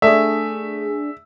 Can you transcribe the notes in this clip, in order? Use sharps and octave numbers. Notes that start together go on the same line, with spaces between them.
A3 D4 G#4 E5